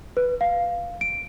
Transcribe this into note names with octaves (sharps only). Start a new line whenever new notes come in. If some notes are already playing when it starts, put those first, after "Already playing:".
B4
F5
D7